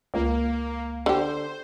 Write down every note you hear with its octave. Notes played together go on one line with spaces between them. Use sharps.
C#2 A#3
D3 G4 C5